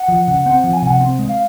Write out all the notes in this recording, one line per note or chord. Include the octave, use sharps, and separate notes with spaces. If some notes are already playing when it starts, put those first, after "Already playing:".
Already playing: F#5
F3
C#3
C4 F#5
F3 F#5
G#5
C3 F#5
C4
G#3
F5